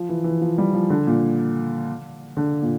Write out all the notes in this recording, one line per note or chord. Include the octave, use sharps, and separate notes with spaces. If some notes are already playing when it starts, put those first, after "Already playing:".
Already playing: F3
E3
E3
F3
G3
F3
D3
A#2
D3
A#2